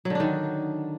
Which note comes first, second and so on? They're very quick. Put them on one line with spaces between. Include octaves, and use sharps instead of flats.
F#3 D3 D4 D#3